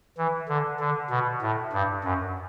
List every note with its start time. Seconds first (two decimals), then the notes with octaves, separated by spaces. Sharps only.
0.18 E3
0.48 D3
0.80 D3
1.10 B2
1.42 A2
1.73 G2
2.03 F#2